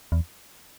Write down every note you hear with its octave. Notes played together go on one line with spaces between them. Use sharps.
E2